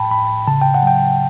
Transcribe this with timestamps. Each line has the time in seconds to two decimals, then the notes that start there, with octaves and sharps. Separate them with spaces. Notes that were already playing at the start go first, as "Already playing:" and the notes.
Already playing: A2 G5 A5 B5
0.11 A2 B5
0.47 C#3 A5
0.61 G5
0.74 F#5
0.83 F#3 G5